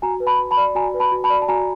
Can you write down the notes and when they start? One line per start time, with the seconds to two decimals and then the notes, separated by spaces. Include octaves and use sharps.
0.02 F#4 G#5 A#5
0.20 B4
0.27 A5 B5
0.39 F#4
0.51 A5 B5
0.57 D5
0.75 F#4 G#5 A#5
0.94 B4
1.00 A5 B5
1.12 F#4
1.24 A5 B5
1.30 D5
1.42 A5
1.48 F#4 G#5 A#5